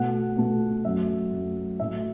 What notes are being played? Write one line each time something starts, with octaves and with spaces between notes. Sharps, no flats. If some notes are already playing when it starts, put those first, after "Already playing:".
Already playing: B2 A3 F#5
B2 A3
F#2 F#3 A3 E5
F#2 F#3 A3
A2 F#3 A3 E5